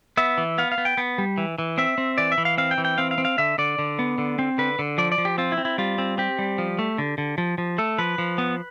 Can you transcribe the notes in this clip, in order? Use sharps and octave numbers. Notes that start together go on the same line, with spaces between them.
B3 E5
E3
B3 F5
F5
B3
G5
B3
G3
E3
E3
C4 E5
C4
E3 D5
E5
E3
F5
C4 F5
G5
E3
G5
C4 F5
F5
C4
F5
D3 E5
D3 D5
D3
B3
D3
C4
D3 B4
D3
F3 D5
D5
F3
G4
C4 F4
E4
C4
E4
G3 F4
C4
C4 G4
G3
F3
A3
D3
D3
F3
F3
A3 A4
F3 B4
F3
B3